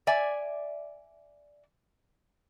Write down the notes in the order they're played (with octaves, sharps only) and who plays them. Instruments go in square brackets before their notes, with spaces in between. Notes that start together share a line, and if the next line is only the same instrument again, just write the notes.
[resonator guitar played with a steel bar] D5 E5 G#5